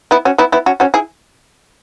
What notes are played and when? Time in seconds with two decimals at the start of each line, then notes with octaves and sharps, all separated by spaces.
0.11 B3 E4
0.25 C#4 F#4
0.38 B3 E4
0.52 B3 E4
0.66 C#4 F#4
0.80 C#4 F#4
0.94 E4 G#4